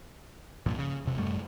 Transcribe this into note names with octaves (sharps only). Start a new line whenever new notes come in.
C2 G2 A#2 F3
C#3
E1 C3
F#2 A2 G3 A3